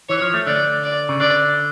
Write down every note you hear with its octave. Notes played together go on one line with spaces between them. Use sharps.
E3 C#5
F3
A3
D3 D5
D5
C#3
D3 D5